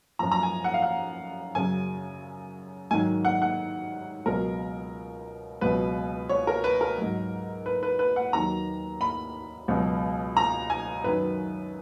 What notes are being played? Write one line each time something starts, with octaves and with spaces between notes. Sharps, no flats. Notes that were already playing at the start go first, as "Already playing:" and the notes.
F#2 F3 A#5
A#5
G#5
F#5
F5
F#5
F#2 C#3 F#3 G#5
G#2 D#3 F#3 G#5
F#5
F#5
C#2 B2 F#3 A#4
C#2 B2 F#3 B4
C#5
A#4
B4
A#4
G#2 F#3
B4
B4
B4
F#5
D#2 D#3 F#3 A#5
B5
C#2 B2 F#3
A#5
G#5
F#2 D#3 F#3 B4